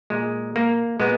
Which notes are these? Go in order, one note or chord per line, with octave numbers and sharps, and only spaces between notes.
A#2 G#3
A#3
A#2 G#3 B3